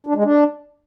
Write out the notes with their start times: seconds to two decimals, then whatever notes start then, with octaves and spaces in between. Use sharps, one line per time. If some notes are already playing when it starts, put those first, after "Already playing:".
0.07 D4
0.15 G#3
0.24 D4